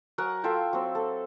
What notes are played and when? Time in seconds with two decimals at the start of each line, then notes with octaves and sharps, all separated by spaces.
0.18 F#3 A#4 F#5 G#5
0.43 F4 A4 E5 G5
0.73 F#3 C4
0.95 A4